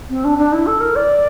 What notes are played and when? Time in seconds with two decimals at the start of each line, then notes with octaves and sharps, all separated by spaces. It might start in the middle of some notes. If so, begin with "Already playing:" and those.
0.09 C4
0.24 D4
0.38 D4
0.53 E4
0.67 A4
0.80 A#4
0.95 D5